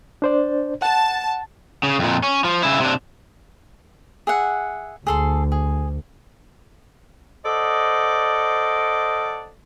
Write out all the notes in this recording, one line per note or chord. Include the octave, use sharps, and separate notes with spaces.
D4 C5 D5
F#5 A5
C#3
F2 A#2
C#4
F3
C#3 E4
C3 D4
G#4 E5 F#5
D2 G#4 A4 C6
G#4
A4 C5 D5 D#5 F#5